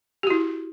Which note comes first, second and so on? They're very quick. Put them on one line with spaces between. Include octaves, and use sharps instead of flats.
G4 F#4 E4